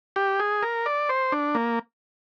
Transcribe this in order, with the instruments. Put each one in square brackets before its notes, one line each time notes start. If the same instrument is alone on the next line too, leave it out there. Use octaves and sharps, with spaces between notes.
[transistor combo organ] G4
G#4
A#4
D5
C5
D4
A#3